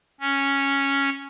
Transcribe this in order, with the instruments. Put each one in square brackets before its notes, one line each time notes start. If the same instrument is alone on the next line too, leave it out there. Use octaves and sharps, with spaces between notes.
[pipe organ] C#4